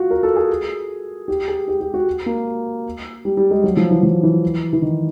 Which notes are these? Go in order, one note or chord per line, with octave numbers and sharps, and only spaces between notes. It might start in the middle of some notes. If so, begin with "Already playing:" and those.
Already playing: F4 F#4
A#4
A4
G#4
G4
G#4
G4
G4
F#4
A#3
G3
G3
G#3
F#3
F3
E3
F3
E3
E3
D#3